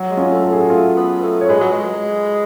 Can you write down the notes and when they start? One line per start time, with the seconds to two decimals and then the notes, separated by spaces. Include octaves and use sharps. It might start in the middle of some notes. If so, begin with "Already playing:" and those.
Already playing: F#3
0.11 G#3
0.17 C#4 F4
0.31 A3
0.43 A4
0.51 A3 G#4
0.61 F#4
0.70 A3 F4 G#4
0.97 B3
1.22 A3
1.41 C#5
1.49 G#3 G#4 B4
1.61 F#3
1.72 G#3